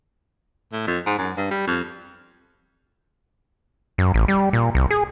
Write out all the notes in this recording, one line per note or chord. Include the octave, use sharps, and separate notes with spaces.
A2
F2
G#2
F#2
G2
G3
F2
F#2
A1
G3
A#2
C2
G#4